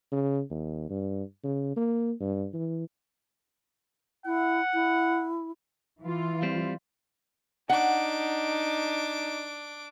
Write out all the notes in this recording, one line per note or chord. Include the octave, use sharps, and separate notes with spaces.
C#3
D#2
G2
C#3
A#3
G2
E3
E4 F#5
E4
E3 F4
G3 C4
D4 D#4 F#5 D6